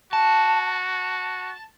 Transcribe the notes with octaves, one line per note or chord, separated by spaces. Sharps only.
F#4 A5